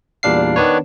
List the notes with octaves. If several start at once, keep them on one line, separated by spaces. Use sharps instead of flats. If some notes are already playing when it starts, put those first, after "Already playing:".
E2 A#2 G3 D4 F5 C7
D#3 B3 D4 B4 C#5